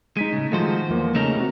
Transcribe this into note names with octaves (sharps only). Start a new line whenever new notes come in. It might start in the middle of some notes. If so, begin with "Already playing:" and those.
G#3 D#4 B6 D#7
A2 C#3
D#3 F3 G#3 A3 F#4 C5
E2 F3 A#3
C#3 A3 D#4 A#4
C3 F#4